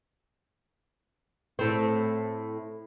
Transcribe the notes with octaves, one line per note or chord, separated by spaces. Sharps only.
A2 C4